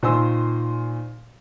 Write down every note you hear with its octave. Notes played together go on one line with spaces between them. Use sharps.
A#2 D#3 C5 G#5 C6 E6